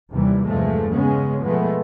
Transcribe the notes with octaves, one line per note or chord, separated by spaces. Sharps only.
D#2 C3 E3 G3
E2 G2 C3 F3 G#3 A3
C#3 G#3 B3 C#4
B2 F3 G#3 A3 B3